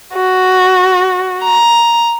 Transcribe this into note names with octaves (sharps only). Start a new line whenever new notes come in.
F#4
A#5